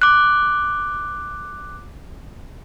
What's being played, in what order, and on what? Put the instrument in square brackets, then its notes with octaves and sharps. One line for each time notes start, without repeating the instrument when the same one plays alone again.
[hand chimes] D6 F#6